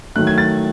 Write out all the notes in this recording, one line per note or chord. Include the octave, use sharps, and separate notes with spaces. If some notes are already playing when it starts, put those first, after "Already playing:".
D#3 F#3 A3 F#6
G#6
A6